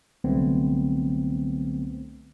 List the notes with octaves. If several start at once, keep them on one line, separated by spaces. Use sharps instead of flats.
C2 D3 F#3 A3 B3 C4